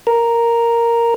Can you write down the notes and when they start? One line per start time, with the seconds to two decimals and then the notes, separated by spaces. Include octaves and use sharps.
0.07 A#4